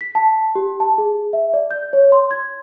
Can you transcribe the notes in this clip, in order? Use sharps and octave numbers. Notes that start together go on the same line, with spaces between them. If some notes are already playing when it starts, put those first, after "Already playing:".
B6
A5
G4
A5
G#4
E5
D5
G6
C#5
C6
G#6